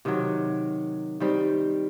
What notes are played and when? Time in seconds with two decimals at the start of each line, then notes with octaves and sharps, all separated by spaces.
0.05 C3 D#3 F#3
1.20 D#3 G3 C4